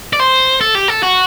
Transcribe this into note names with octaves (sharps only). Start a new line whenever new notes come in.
D5
C5
A4
G4
A4
F#4